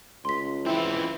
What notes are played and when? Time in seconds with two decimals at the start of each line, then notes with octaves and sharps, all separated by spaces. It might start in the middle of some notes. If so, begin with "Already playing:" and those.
0.25 C#2 C6 B6
0.66 E3 C4 E4